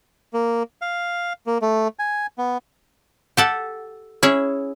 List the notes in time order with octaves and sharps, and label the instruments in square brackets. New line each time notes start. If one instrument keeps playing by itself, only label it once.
[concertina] A#3
F5
A#3
A3
G#5
B3
[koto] G4 A4 F#5
C#4 E4 G#4